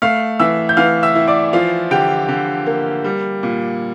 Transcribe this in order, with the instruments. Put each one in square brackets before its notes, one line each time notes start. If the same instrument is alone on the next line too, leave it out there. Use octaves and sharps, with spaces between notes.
[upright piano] A3 F5 F6
E3 E5 E6
G6
E3 F5 F6
E5 E6
E4
D5 D6
F3 F4 F5
D3 G4 G5
D3
A#3
G3
A#2